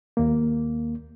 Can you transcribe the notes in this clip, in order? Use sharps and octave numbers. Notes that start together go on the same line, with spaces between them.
D#2 A#3